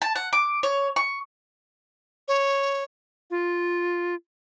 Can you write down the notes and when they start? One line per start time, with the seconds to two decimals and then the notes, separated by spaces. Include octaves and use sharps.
0.02 A5
0.16 F#5
0.33 D6
0.63 C#5
0.96 C#6
2.28 C#5
3.31 F4